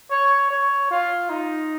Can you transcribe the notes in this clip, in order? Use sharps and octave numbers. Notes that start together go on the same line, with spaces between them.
C#5
C#5
F4
D#4